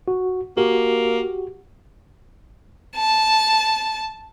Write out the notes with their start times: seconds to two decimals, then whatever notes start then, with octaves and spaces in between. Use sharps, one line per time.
0.08 F#4
0.57 A#3 F#4 G4
2.96 A5